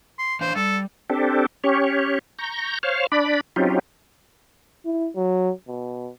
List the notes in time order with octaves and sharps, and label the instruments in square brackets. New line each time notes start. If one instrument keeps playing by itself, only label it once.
[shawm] C6
[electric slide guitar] E3 D4 F5 [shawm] C5
[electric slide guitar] G3 [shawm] A4
[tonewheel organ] C4 D4 G4 A4
C#4 G4 C#5
A#5 C#6 G6
C5 C#5 F5
D4 D5 B5
F#3 C4 C#4 D#4 F4 G4
[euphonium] E4
F#3
B2